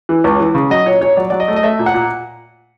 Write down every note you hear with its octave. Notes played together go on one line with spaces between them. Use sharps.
E3
C#2
E3
C#3
F#3 D#5
A#2 C#5
A#2 C#5
F#3 D5
F#3 D5
D#5
A3
D#5
A3 E5
A#2
F#5
A#2